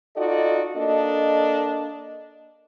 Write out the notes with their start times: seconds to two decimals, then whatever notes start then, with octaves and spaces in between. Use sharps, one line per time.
0.17 D#4 F4 F#4 A4 D5 D#5
0.76 A#3 D4 A4 D#5